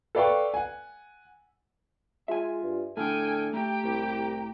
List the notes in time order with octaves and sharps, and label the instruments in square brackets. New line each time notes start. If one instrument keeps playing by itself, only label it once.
[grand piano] A4 B4 D5 F5 G5 C#6
F#5 G#5
[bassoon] G#3 [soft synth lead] F4 [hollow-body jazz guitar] E5 G#5
[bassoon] G2
[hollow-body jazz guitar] A2 D3 [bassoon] A4 [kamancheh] G5 G#5 [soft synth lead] F6
[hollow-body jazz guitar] A3 [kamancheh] G4 G5 [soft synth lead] A#5
[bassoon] C2 [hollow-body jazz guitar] A2